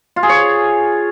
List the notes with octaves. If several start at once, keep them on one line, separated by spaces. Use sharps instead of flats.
F4
G#4
C#5